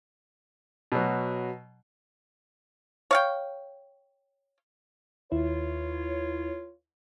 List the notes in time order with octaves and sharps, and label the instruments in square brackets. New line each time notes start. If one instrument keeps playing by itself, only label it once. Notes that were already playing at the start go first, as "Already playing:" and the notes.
[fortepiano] B2 F#3
[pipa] C#5 F5 G5
[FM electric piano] D#2 E4 [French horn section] F4 B4 C#5